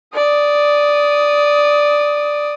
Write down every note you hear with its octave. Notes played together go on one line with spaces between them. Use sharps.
D5 D#6